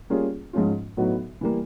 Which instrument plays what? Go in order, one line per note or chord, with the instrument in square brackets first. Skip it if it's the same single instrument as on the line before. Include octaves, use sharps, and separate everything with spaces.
[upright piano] G3 A#3 C#4 F4 G#4
G#2 F3 G#3 C#4 F4
A2 F#3 B3 D#4 F#4
E3 G3 A#3